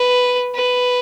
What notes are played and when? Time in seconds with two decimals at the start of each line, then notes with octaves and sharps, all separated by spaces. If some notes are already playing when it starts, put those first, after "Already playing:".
Already playing: B4
0.55 B4